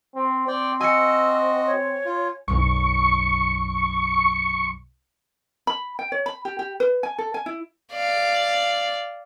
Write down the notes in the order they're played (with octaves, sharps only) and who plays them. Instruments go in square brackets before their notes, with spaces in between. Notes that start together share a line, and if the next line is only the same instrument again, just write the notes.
[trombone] C4
[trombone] C4 [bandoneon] D5 G5
[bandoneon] F#4 D#5 [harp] G#5 C#7 [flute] E6
[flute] C#5
[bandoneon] F4
[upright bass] B1 F#2 [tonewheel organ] C#6
[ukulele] B5
G5
C#5
B5
G4
G4
B4
G#5
A4
G#5
E4
[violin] D5 F5